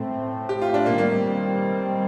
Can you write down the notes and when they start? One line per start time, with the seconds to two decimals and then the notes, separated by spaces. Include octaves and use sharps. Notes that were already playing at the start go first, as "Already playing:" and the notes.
Already playing: A2 A3 C4
0.49 G4
0.62 F4
0.74 D4
0.86 A#3
0.98 D#3 G3 A#3 C4